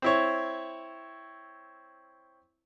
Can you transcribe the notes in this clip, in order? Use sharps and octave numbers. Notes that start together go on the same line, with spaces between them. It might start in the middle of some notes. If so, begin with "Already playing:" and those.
C4 E4 C#5